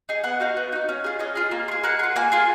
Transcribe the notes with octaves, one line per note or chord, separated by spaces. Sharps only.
D#4 G#4
B3 F#5
D#4 F#4 F5
B3
D#4 F#4
C#4
F4 G#4
C#4 D#5
F4 G#4
A#3
F4
G#4
A#3 F#5
G#4
F4
A#3 G#5
F4 G#4